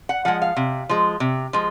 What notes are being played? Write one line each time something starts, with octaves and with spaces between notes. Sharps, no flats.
F#5
F3 G#3 F#5
F5
C3
F3 G#3
C3
F3 G#3